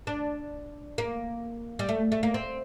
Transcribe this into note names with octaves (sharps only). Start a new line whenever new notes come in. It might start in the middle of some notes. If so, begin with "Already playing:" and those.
D4
A#3
G3
A3
A3
A#3
C4